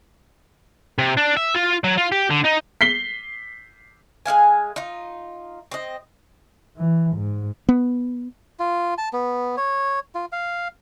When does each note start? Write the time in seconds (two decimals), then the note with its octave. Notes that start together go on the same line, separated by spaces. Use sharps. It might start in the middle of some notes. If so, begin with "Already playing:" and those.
0.99 C3
1.17 D4
1.37 E5
1.55 F4
1.84 F#3
1.98 F4
2.12 G4
2.31 D3
2.45 D#4
2.81 B6 C7 G7
4.26 G#3 D#4 F5 G#5
4.76 D#4 F4
5.71 C4 D#5
6.77 E3
7.16 G#2
7.69 B3
8.60 F4
8.98 A5
9.13 B3
9.57 C#5
10.15 F4
10.32 F5